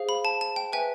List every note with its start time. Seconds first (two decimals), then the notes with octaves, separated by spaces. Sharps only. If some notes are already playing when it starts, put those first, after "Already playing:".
Already playing: G#4 C5 F5
0.09 B5
0.25 A5
0.41 A5
0.56 G5
0.73 B4 E5 G5 G#5